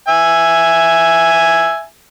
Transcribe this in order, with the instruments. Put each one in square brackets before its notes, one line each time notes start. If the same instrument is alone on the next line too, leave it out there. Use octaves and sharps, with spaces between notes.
[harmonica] E5 G#5